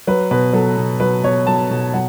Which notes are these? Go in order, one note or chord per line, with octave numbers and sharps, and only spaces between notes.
F#3 B4
B2 B4
F#3 A4
B2
F#3 B4
B2 C#5
F#3 A5
B2
F#3 F#5